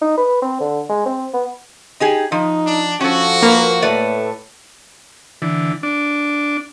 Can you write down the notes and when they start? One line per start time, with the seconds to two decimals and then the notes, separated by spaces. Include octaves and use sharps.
0.02 D#4
0.17 B4
0.42 C4
0.60 D3
0.89 G#3
1.06 C4
1.34 B3
2.00 D#4 G4 G#4
2.32 F3 D#4
2.66 D4
3.01 F3 C#4 F#4 A4
3.42 A#3 A#4 B4
3.82 A2 A3 B4 D5
5.42 D3 E3
5.83 D4